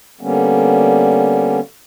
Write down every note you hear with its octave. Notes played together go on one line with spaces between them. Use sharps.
D3 G3 A#3 B3 C#4